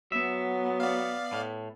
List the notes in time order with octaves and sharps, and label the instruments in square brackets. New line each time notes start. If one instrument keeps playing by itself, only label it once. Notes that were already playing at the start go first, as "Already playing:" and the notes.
[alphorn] F#3 [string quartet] B3 [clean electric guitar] E5
[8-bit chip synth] D5 F5
[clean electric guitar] A2